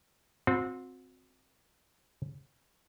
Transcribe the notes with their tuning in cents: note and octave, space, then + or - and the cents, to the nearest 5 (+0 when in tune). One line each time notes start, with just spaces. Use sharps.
C4 +0 F#4 -40